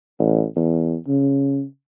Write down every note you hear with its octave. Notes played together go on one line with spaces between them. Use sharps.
A1
E2
C#3